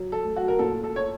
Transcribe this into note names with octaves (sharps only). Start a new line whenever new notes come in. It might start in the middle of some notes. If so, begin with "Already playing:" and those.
Already playing: F#3
A4
A3
F#4
A#4
A#2 A4
A4
C#5